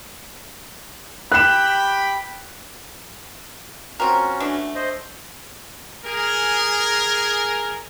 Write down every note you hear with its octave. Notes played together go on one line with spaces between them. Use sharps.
G4 G5 B5 F#6 E7
C4 C#4 F4 F#4 A#4
E3 A3 D4
C5 D#5
G#4 A#4